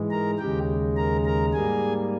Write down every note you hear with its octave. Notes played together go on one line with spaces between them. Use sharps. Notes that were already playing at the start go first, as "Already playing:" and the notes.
Already playing: G#2 E3 G#3
A#4 A#5
D#2 C#3 G#3 G4 G5
A#4 A#5
A#4 A#5
G#2 G3 A#3 G#4 G#5